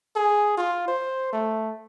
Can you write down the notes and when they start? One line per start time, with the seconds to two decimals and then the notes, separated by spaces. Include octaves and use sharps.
0.16 G#4
0.58 F4
0.88 C5
1.33 A3